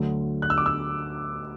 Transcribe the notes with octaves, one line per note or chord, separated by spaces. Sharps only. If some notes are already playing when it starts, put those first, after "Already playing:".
Already playing: D2 D3 F#3
F#6
E6
D6
E6